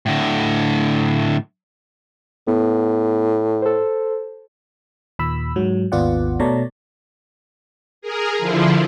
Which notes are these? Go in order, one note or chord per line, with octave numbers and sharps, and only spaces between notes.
A2 D3
A2 B3
A4 C5
D#2 A#2 B5 E6
G#2 F#3
G#1 D#2 B3 F4 D5 F#5
B2 A3 C#5 D5 A5 A#5
G#4 A#4
D3 F3 E4 F4